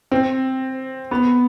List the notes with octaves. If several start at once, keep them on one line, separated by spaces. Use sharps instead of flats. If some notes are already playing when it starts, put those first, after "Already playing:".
C4
B3